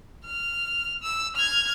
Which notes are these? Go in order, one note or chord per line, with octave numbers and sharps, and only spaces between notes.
F6
E6
F6 G#6